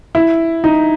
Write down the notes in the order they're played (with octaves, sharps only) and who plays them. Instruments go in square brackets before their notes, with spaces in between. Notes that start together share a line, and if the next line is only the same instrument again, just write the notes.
[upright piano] E4
D#4